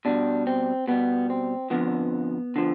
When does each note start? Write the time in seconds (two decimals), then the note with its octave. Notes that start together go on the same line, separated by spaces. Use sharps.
0.05 B2 G3 D4
0.47 C4
0.88 B2 G3 B3
1.30 C4
1.70 F2 D3 F3 B3
2.56 D3 F3